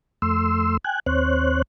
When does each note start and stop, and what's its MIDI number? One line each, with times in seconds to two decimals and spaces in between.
0.22 0.77 41
0.22 0.77 57
0.22 0.77 84
0.22 0.77 88
0.84 1.00 79
0.84 1.00 80
0.84 1.00 90
1.06 1.62 39
1.06 1.62 60
1.06 1.62 72
1.06 1.62 73
1.06 1.62 90